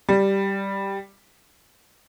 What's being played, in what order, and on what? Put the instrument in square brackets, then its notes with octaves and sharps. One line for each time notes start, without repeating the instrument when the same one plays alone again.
[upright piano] G3